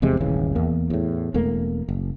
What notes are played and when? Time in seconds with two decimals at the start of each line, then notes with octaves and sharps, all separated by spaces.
0.02 F1 E2 C3 G#3
0.21 D#1 G#1 C#3 E3
0.55 E2 A#3
0.90 E2 A2
1.34 E1 E2 A3 A#3
1.89 F#1